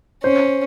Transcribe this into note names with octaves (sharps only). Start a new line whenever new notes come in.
C#4 C5